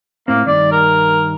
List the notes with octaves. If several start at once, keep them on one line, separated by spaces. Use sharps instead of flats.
A2 A#3 C4
G2 D#3 D5
A#4